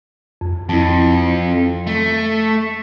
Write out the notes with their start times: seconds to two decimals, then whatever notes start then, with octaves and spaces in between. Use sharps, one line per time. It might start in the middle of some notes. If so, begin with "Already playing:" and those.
0.41 F2
0.69 F2 E4 A5
1.87 A3